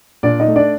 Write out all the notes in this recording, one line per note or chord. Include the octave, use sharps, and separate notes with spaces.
A#2 D4 D5
D#4 D#5
A3
D4 D5